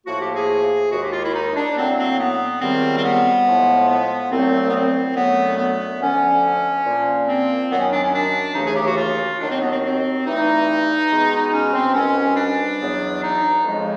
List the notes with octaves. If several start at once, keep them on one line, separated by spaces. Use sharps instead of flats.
A2 F3 A#3 F#4
G4
G#4
D#2 D#3 G#3 F#4
G4
F4
E4
D#4
D4
A2 F#3 A#3 C4
C4
B3
C#2 C3 D#3 G3 C4
C4
B3
A2 F3 G#3
B3
C2 A#2 F#3 A3 C4
B3
C4
F#2 D3 F#3 A3 B3
B3
D2 D3 F3 C#4
A#2 F3 A#3
C4
F#2 D#3 F#3 B3
C#4
D4
C#4
D4
D#2 C#3 E3 A3 D#4
G#4
G4
F#4
F4
D#2 D#3 F#3 D4
C4
B3
C4
C4
G2 E3 A3 D#4
B2 G#3 B3
C#4
C4
C2 B2 G3 C#4
D4
E2 B2 F#3 B3
D#4
F2 C#3 F3 G#3